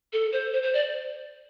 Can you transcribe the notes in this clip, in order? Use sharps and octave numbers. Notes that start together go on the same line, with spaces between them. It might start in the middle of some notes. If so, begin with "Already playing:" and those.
A4
C5
C5
C5
D5